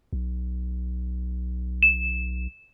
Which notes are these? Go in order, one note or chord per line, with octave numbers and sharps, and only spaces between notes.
B1
E7